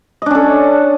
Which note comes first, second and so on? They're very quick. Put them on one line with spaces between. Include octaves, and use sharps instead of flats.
D#5 D4 C#4 A4